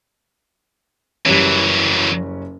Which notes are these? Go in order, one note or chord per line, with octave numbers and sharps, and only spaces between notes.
F#1 E3 F#3 G3 C#4